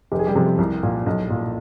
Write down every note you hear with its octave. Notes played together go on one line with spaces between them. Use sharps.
F1 G4
G#4
G3 G4
F2 C3
C2
A#2
B1
A#2